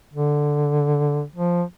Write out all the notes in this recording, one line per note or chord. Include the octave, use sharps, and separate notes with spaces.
D3
F3